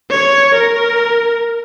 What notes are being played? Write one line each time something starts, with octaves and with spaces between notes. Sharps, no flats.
C#5
A#4